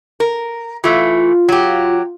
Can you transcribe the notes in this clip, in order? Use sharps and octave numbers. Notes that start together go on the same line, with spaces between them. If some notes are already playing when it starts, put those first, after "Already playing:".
A#4
E3 A3 F4
F#3 G4